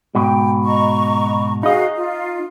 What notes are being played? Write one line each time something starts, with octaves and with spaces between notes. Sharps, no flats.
G#2 B2 G5
D#5 A#5 C#6
D#4 F#4 G#4 D#5 F5
F4